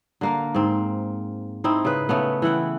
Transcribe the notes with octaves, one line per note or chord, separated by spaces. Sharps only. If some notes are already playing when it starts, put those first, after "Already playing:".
D3 A#3 A#4
G#2 C4
C4 D#4 E4
C#3 B4
C#3 A3 B3
E3 E4 F#5 G5